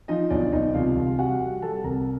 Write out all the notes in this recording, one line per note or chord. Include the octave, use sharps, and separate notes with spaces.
F3 D#4 D#5
B1 D4 D5
B1 D#4 D#5
C2 F4 F5
C2
G3 F#4 F#5
G3
G3 A4 A5
C2 A#4 A#5